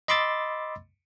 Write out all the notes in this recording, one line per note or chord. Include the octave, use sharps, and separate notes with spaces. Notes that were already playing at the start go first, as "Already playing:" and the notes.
D#5 B5 C6 D6 E6 A6